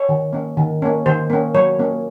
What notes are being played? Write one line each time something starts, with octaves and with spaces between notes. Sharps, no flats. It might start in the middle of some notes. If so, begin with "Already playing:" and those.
Already playing: C#5
D#3
A#3 C#4
D#3
A#3 C#4
D#3 C5
A#3 C#4
F#3 C#5
A#3 C#4